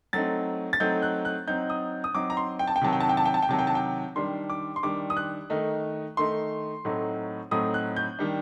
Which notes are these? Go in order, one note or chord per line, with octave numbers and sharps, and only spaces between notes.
F#3 A3 C4 D#4 A6
A6
F#3 A3 C4 D#4 G6
F#6
F#6
F#3 C4 D#4 G6
D#6
D#6
F#3 C4 D#4 D6
A#5
C6
G5
A5
G5
C3 D#3 F#3 A5
G5
A5
G5
A5
G5
A5
G5
C3 D#3 F#3 A5
G5
A5
G5
D#3 G3 D4 C6
D6
C6
D#3 G3 D4 D6
D#6
F#6
D#3 A3 D#4
D#3 A3 D#4 C6
A2 F#3 A3 C4 D#4
A2 F#3 A3 C4 D#4 D#6
F#6
G6
D#3 G3 D4